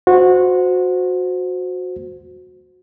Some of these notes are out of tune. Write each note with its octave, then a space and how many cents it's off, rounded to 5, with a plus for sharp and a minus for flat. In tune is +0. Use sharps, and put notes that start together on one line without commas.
F#4 -20 C5 -10